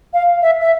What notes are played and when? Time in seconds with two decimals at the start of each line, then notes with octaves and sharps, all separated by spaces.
0.14 F5
0.42 E5
0.60 E5